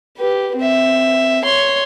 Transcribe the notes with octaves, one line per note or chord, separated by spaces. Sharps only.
G4 B4
C4 E5
C#5 C6